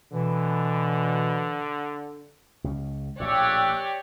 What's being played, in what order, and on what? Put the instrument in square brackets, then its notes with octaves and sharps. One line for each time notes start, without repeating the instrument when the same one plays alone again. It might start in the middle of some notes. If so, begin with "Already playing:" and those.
[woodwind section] B2 E3 [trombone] D3
[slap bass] C#2 C#3
[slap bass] A#1 A2 [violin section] G4 C#5 D5 [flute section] D6 E6 F#6